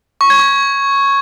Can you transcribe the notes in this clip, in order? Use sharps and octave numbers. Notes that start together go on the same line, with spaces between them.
C#6
G#6
C#6